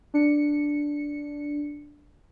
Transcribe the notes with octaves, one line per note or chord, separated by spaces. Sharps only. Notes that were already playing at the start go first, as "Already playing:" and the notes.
D4 C#7